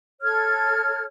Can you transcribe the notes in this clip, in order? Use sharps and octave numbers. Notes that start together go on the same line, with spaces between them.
A4 C#5 F6 G#6